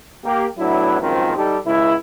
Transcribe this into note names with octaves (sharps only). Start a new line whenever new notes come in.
A#3 G4
A2 F#3 B3 D4 E4
C#2 F#2 D#3 F3 C4 F4
G3 D#4 G4 A4
C#2 E4